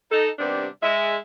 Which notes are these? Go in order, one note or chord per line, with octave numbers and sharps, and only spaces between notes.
D#4 A4
C3 D#3 G3 B3 C4 D4
G#3 E5